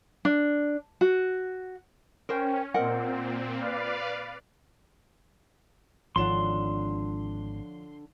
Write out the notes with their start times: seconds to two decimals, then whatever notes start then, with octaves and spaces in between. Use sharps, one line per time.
0.25 D4
1.01 F#4
2.29 C#4 A#4 C5 G5
2.74 A#2 C4 A#4 D#5 F#5
3.59 B4 D5 F5
6.16 G#1 D3 F3 D4 C#5 F#5 C6 E7